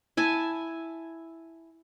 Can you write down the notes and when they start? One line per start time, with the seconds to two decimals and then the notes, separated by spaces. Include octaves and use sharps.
0.17 E4 G#5 A5